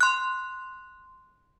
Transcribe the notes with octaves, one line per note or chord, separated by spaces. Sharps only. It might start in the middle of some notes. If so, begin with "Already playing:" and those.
C6 F#6